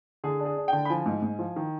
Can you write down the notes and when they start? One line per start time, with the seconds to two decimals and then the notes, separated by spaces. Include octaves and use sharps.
0.24 D3 G#4
0.40 D4
0.45 G#4
0.57 D4
0.68 D3 G5
0.85 B5
0.89 F3 G#5
1.06 G#2
1.22 G#2
1.39 F3
1.56 D#3